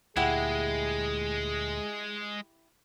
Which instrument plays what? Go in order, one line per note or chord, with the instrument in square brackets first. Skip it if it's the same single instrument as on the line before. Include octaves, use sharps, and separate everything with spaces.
[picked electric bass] D2 A#2 [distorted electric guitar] G#3 [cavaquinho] E4 G4 F#5 [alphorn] G#4